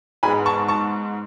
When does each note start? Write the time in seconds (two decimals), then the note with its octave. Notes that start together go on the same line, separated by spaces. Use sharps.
0.23 G#2 G#3 B3 G#5 B5
0.46 A5 C#6
0.68 A5 C#6